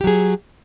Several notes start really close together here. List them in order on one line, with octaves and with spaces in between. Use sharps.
G4 F#3 G#4